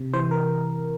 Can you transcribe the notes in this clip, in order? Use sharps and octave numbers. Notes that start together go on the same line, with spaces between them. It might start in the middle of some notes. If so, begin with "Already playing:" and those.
Already playing: C3
E3 C5
A#4